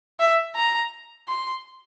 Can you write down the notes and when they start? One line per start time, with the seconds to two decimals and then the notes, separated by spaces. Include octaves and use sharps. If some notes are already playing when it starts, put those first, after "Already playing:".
0.19 E5
0.56 A#5
1.28 C6